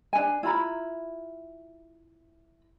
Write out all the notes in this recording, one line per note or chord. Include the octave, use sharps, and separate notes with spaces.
D4 G#5
E4 F4 A#5 B5